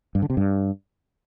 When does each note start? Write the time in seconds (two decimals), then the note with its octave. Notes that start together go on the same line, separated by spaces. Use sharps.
0.15 G2
0.22 D3
0.30 C3
0.37 G2